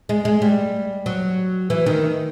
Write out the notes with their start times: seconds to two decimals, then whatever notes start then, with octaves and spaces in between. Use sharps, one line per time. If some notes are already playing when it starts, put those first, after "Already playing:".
0.09 G#3
0.25 G#3
0.42 G3
1.06 F#3
1.70 E3
1.86 D#3